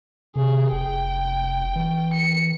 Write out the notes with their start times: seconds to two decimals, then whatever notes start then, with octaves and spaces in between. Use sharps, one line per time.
0.36 C3 G#4
0.72 F1 G5
1.76 E3
2.14 C#7